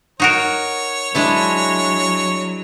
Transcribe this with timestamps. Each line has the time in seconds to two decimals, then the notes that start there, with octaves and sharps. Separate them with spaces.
0.20 D#4 F#4 A#4 C#5
1.15 F#3 G#3 D4 E4